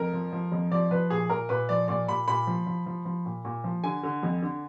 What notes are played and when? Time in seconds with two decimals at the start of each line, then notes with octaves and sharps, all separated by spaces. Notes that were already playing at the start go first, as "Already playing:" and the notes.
Already playing: F2 A#4
0.13 F3
0.32 F3
0.52 F2
0.71 F3 D5
0.91 F3 B4
1.10 A#2 G#4
1.30 A#2 A#4
1.49 A#2 B4
1.69 F3 D5
1.88 A#2 D5
2.08 A#2 B5
2.28 A#2 B5
2.47 F3
2.66 F3
2.86 F3
3.05 F3
3.26 A#2
3.45 A#2
3.64 F3
3.83 D3 G#5
4.03 D3
4.23 F2
4.42 D3